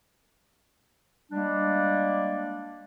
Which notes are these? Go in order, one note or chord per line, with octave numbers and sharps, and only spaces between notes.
G3 G#3 A#3 D4